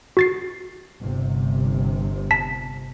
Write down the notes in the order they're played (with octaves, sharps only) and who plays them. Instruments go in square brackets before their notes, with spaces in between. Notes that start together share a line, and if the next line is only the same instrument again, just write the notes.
[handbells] F#4 A6 C7
[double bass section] G1 C3
[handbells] A5 B6